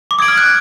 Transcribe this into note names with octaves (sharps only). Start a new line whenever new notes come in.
D6
D#6 G#6 D7 F#7
F6
F#6